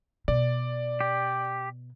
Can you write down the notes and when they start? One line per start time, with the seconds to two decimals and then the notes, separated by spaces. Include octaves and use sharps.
0.28 B2 D5
1.01 G4